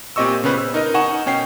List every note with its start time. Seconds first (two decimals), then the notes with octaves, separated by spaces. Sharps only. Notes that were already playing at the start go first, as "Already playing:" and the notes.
0.16 A#2 C4 G4 D#5 C#6 E6
0.44 C#3 B3 C#4 B4 C5
0.58 E6
0.74 D#4 A#4 D#5
0.94 D#4 F#5 G#5 C#6 E7
1.26 B2 C#4 G5 C7